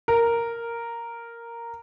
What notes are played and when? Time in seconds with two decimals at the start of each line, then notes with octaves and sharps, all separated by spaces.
0.08 A#4